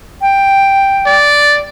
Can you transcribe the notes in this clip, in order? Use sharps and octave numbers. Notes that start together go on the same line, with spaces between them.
G5
D5